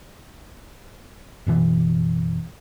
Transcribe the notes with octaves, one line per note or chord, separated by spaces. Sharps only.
F#1 B2 E3